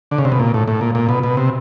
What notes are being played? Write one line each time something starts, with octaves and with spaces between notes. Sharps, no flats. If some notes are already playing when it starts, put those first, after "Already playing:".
D3
C#3
C3
B2
A#2
A2
A2
A#2
A#2
B2
B2
C3